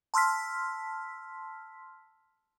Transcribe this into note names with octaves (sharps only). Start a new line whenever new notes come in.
A5 C6 E6 F6 B6